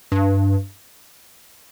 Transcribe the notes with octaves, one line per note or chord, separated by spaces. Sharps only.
G2